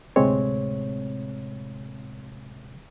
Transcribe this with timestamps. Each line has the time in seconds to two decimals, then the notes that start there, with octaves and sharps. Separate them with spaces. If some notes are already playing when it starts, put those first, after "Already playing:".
0.16 D2 A2 C3 G#3 C4 C#5